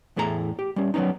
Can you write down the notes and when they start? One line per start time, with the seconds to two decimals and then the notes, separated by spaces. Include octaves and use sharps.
0.16 E2 A2 A3 G#4 B4 A#5
0.59 G4
0.76 G3 C#4
0.94 F#3 G3 B3 C#4 D#4